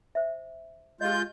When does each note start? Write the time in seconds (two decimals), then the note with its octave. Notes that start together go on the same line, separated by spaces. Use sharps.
0.15 C5 E5
1.01 G#3 F4 G4 D#5 G6